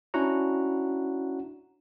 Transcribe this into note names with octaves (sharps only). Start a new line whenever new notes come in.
C#4 D4 E4 F#4 F#5 A#5